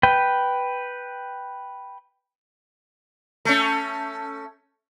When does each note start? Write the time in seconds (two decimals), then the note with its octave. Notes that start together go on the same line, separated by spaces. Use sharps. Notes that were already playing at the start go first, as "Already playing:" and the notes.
0.03 B4 G5
3.45 A3 C#4